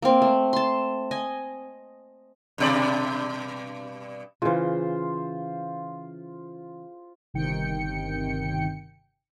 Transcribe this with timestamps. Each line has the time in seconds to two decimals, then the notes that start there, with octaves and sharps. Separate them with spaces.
0.02 A#3 C4
0.22 A3
0.53 A5 C6
1.11 D#5 G#5
2.58 G2 B2 D5
4.42 C#3 E3 F4 C5
7.34 G1 C3 D#3 G5 C#7